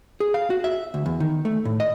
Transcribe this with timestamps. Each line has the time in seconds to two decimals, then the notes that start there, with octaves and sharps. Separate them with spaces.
0.20 G#4
0.34 F5
0.50 F#4
0.64 E5
0.94 D2
1.06 E2
1.20 D#3
1.45 A3
1.65 A2
1.80 D#5